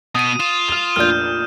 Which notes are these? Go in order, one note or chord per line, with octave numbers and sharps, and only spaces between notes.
B2 B3 D#6 D#7
F4 E7
F6 F7
F1 A#2 D4 F6 G6